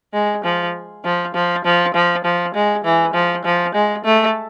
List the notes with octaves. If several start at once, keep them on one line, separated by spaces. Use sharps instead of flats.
G#3
F3
F3
F3
F3
F3
F3
G#3
E3
F3
F3
G#3
A3